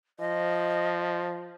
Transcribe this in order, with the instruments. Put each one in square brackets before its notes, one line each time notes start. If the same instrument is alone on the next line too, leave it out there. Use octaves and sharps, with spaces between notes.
[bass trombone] F3 [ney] D#5